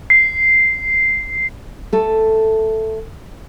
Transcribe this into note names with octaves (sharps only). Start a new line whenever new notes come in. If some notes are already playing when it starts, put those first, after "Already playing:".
C7
A3 A4